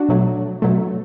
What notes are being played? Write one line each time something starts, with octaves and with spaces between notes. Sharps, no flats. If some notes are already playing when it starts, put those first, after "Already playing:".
Already playing: D4 F#4
B2 F#3 A3
B2 F#3 A3